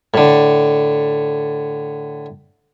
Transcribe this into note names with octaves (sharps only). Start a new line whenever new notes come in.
A2 D3